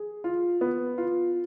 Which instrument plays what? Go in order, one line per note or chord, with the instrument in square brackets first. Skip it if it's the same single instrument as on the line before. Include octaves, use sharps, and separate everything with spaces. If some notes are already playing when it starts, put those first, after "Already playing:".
Already playing: [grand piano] G#4
F4
B3
F4